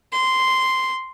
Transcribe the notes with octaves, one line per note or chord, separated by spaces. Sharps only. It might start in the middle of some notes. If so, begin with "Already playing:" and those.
C6